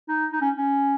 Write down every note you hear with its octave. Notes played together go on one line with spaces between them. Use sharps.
D#4
D#4
C#4
C#4